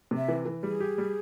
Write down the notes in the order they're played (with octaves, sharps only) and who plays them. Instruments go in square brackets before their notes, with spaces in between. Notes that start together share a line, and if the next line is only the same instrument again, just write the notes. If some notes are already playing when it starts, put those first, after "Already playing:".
[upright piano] C3
[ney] E5
[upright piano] E3
E3
[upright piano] G3 [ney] G#4
[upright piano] G4
G3